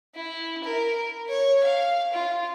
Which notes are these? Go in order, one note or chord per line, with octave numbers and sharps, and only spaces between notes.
E4
A#4
C#5
F5
F4